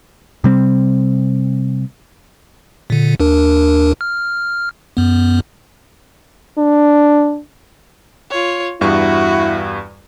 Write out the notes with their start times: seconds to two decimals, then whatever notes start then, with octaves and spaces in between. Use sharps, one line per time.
0.44 C3 G3 C4
2.90 A#2 D3
3.20 D#2 D4 A#4
4.01 F6
4.97 F#2 B3
6.58 D4
8.30 F4 C#5
8.81 E2 G2 E4 F#4 C#6